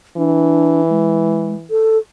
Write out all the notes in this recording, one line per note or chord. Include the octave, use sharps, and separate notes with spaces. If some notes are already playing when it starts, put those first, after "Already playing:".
E3 D4
G#3
A4